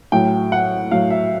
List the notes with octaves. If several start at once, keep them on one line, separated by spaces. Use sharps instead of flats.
A2 F#3 G5
F#5
A2 F#3 F5
E5